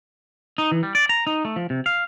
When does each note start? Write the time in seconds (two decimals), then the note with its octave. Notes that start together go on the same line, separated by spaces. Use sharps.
0.58 D#4
0.72 E3
0.83 G3
0.95 D5
1.09 A#5
1.27 D#4
1.45 A3
1.56 F3
1.70 C3
1.86 F5